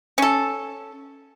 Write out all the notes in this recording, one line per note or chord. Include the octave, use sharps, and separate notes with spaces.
C#4 A4